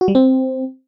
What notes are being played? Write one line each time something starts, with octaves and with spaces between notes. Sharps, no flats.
F#4
G3
C4